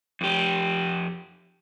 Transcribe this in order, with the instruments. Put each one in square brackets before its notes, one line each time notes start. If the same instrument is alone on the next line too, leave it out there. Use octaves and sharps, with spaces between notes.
[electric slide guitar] F2 G4